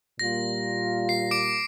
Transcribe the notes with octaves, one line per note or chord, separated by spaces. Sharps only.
A#2 G3 A#3 F4 A#6
C7
D6 D7